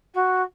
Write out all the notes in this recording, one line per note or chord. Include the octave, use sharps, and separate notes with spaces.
F#4